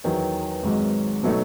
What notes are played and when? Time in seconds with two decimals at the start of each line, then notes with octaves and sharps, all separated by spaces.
0.04 E2 D#3 F#3
0.63 G#1 G#2 F#3
1.23 B2 F#3 A3 D#4 A4